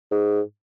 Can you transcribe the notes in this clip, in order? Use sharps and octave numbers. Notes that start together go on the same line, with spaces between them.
G#2